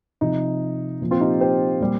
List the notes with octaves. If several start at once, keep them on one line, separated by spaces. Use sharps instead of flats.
C3 F3 D#4
A#2 F3
C4 F4
D#4 G4
G4 C5
A#2 G3